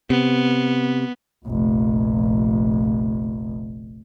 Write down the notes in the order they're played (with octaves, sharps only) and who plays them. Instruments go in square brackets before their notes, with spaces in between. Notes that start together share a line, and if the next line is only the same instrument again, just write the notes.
[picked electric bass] C3 [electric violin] B3
[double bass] F1 A#1